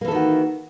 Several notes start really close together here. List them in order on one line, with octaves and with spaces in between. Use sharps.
A#3 E3 A4 D#3 F#4